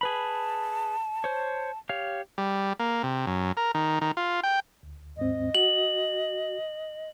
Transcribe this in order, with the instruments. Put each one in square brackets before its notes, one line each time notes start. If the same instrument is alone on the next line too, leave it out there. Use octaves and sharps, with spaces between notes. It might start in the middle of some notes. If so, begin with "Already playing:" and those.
[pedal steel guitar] G#4 B4 B5 [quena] A5
[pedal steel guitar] C5 C#5
G4 C#5 F5
[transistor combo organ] G3
A#3
C3
F#2
A#4
D#3
D#3
F4
G5
[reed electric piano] D2
[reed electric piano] D#2 G#2 C4 [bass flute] D#5
[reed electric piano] F#4 [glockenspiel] F#7